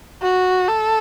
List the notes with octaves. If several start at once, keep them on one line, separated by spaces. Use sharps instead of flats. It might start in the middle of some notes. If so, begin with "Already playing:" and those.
F#4
A4